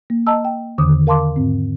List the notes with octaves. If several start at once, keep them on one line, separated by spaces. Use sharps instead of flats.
A#3
D#5 A5 A#5 E6
G5
E2 D3 D#3 D6 D#6
A#4 F5 A5 C6 D6
G#2 C4